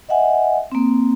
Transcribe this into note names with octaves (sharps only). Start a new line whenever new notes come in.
D#5 E5 F#5 G#5
A#3 C4